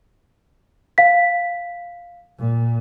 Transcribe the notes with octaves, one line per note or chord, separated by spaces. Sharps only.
F5 B6
A#2